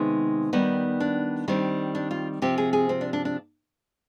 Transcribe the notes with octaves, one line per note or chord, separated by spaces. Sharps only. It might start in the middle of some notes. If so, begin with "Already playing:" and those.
Already playing: C3 D#3 G#3 B3 D#4
D#3 G3 B3
D4
D#3 G3 C4
D4
F4
C3 F3 C4 G4
G#4
G#4
C4
D4
D4
D4